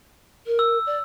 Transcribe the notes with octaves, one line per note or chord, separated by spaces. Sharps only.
A#4
E6
D5